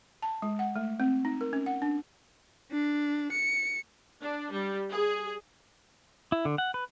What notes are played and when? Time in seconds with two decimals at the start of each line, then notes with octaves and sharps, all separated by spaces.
0.22 A5
0.42 G#3
0.59 F#5
0.76 A3
1.00 C4
1.25 D#4
1.41 A#4
1.53 C#4
1.66 F#5
1.82 D4
2.71 D4
3.32 C#7
4.21 D4
4.52 G3
4.91 G#4
6.32 E4
6.45 D3
6.58 F#5
6.74 B4